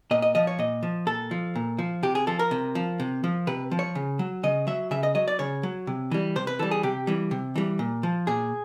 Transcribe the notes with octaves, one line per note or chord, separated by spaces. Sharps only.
A#2 D#5
D#5
F3 D#5
C#5
A#2 D#5
F3
A#2 A4
F3
A#2
F3
C3 G4
G#4
F3 A4
A#4
C3
F3
C3
F3
C3 B4
F3
C#5
C#3
F#3
C#3 D#5
F#3 E5
C#3 E5
D#5
F#3 D#5
D5
C#3 C#5
F#3
C3
E3 G3
C3 C5
B4
E3 G3 A4
G#4
C3 G4
E3 G3
C3
E3 G3
A#2
F3
A#2 G#4